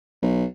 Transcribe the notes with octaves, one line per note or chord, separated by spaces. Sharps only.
B1